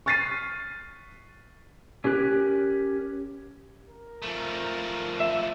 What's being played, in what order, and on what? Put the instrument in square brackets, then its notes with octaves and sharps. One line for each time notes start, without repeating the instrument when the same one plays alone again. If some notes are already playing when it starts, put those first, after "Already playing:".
[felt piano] C#6 F6 A6 B6 C7 D#7
[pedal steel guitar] C#4 G4 A#4 F#6
[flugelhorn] A#4
[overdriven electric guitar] F3 A3
[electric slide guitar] E5